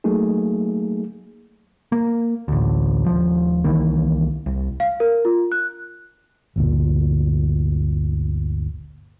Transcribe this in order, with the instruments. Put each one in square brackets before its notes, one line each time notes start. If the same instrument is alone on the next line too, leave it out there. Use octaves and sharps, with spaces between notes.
[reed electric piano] F#3 A3 A#3 D#4 G#4
[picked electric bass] A#3
A1 D2
D#1 F3
C2 D#3 E3 A#3
C2
[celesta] F5
A#4
F4
F#6
[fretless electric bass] G1 D2 A#2